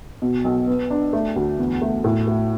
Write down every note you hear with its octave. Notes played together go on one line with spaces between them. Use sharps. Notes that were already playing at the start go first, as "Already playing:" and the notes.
B2
B1
B3
D4
A3
D2
E2
A3
A2
A3